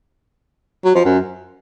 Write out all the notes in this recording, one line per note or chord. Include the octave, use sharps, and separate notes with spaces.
F#3
F3
F#2